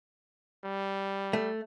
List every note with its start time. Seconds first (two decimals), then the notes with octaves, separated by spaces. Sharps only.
0.64 G3
1.33 A3